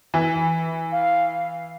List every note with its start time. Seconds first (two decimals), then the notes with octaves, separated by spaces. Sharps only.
0.14 E3
0.93 F5